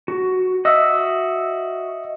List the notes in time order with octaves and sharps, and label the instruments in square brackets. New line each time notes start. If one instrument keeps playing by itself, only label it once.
[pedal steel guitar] F#4
[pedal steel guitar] F#4 E6 [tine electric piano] D#5 E5